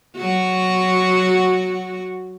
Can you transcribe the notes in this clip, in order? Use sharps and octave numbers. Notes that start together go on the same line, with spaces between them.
F#3 F#4